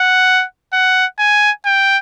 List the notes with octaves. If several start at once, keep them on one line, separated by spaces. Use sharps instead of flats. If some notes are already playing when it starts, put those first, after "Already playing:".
Already playing: F#5
F#5
G#5
G5